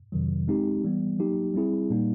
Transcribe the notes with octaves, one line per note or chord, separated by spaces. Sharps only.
F2 C3 D#3 F#3
G#3 C4 D#4 G4
E3 G3 B3
F#3 A#3 D#4 G4
G3 C4 E4 G#4
A#2 G3 A#3 D#4